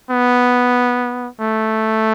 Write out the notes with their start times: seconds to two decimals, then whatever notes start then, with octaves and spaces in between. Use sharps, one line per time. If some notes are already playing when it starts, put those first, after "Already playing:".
0.11 B3
1.41 A3